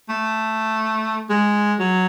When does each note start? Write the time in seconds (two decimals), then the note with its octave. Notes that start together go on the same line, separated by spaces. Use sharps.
0.09 A3
1.30 G#3
1.79 F#3